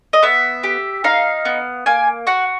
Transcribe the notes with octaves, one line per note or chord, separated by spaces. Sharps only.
D#5
B3 E5
G4
D#4 F5
B3
A#3 G#5
F#4 F#5